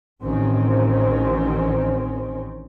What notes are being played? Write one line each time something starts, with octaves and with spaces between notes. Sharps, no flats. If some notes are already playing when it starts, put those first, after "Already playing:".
A1 D#3 C4 C#4